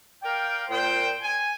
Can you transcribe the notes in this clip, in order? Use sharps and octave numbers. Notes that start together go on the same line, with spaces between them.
A#4 D5 F5 G5
A#2 C5 G5
G#5